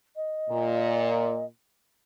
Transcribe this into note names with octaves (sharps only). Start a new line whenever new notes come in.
D#5
A#2